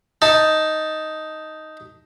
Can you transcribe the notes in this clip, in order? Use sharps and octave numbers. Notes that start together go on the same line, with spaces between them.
D#4 A5